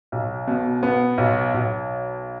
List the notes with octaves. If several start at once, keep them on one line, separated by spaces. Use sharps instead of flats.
B1
B2
B3
B1
B1